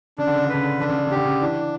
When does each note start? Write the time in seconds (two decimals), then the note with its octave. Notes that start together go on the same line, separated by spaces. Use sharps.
0.18 C#3 D4
0.27 D3
0.36 C#3
0.45 D3
0.50 C#3 B4
0.63 D3
0.72 C#3
0.80 D3 D4
0.89 C#3
0.98 D3
1.07 C#3 G4
1.16 D3
1.25 C#3
1.41 E3 D4